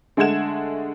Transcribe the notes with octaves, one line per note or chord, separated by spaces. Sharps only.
D3 G#3 A3 F#5 G#6 E7